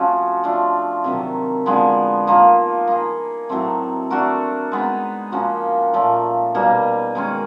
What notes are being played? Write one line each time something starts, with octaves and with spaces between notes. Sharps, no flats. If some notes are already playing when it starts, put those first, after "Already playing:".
Already playing: F3 A3 C#4 F#4
A3 D4 F4
C3 D#3 F#3
D3 F3 G#3 B3
F3 A#3 D#4
A#3 D#4 G#4
A2 F#3 A3 C4
A3 D4 F#4 A#4
G#3 B3 D#4
F3 A#3 C#4 F#4
A#2 F3 A3
B2 G3 A#3 D#4
D#3 G#3 C#4